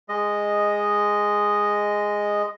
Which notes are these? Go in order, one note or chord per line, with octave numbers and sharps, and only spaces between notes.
G#3 D#5